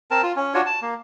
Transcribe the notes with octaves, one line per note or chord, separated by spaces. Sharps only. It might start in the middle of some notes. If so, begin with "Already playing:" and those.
C4 A#4 A5
F4
C#4
D4 F4 F#4 C#5
A5
A#3